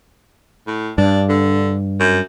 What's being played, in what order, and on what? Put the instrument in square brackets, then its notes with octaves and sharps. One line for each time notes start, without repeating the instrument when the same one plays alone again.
[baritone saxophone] A2
[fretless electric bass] G2 [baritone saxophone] D4
[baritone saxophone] D3
F#2